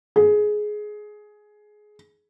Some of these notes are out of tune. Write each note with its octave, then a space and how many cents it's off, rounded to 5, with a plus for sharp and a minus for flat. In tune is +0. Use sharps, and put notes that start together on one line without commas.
G#4 +15